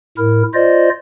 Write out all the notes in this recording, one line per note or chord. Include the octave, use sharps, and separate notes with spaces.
A2 E4 A#4
F4 C5 D5 D#5